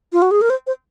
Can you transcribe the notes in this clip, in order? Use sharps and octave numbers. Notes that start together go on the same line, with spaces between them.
F4
F#4
G#4
A#4
C5
C5